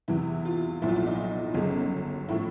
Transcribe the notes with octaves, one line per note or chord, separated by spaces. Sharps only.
E2 C3 E3 E4
F4
B1 A#2 F3 E4
F4
E4
D#4
D#4
G1 F#2 C#3
A2 F3 E4